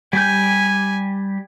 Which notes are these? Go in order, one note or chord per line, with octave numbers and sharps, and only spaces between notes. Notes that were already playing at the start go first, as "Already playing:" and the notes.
G3 G4 G#5 G6